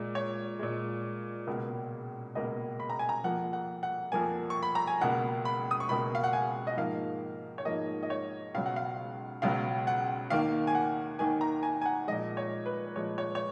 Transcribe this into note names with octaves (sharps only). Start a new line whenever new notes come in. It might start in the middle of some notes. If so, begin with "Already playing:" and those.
Already playing: A#2 G#3
C#5
A#2 G#3
C#2 B2 A#3
C#2 B2 A#3 D#5
B5
A#5
G#5
A#5
F2 F3 A#3 F#5
F#5
F#5
F2 F3 A#3 G#5
C#6
B5
A#5
G#5
C#2 B2 A#3 F#5
B5
D#6
C#6
C#2 B2 A#3 B5
F5
F#5
G#5
D#5
G#2 F3 A#3 F5
C#5
G#2 F3 A#3 D#5
D#5
C#5
C#2 B2 F#3 F5
F#5
F5
C#2 B2 F#3 F5
F#5
D#2 D#3 A#3 F5
G#5
F#5
D#2 D#3 A#3 G#5
A#5
G#5
G#5
F#5
A#2 F3 G#3 D#5
C#5
B4
A#2 F3 G#3 C#5
C#5
C#5